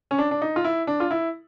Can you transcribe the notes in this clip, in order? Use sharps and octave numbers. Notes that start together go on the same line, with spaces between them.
C#4
D4
D4
D#4
F4
E4
D4
F4
E4